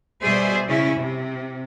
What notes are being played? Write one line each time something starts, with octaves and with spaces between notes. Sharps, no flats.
B2 G3 G#4 C5 D5 E5
C#3 C#4 E4
C3